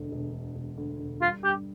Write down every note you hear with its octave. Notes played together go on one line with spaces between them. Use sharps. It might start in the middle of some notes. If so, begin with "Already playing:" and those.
Already playing: E1 D2 D3
E1
D3
E1
D2
E1
G3 F4
G2 G4